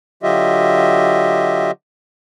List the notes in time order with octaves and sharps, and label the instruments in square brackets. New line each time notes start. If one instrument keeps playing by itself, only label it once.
[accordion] D3 F#3 F4 G4 D#5 E5